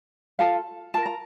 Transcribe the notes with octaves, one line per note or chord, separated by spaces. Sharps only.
F4 A4 F5 A5
F4 A#4 A5
A#5